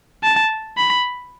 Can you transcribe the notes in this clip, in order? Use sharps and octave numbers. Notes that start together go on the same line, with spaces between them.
A5
B5